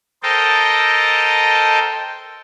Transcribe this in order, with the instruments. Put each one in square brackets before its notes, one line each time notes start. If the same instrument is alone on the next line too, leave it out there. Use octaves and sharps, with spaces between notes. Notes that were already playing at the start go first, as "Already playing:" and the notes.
[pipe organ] A4 A#4 C5 D#5 G5 A5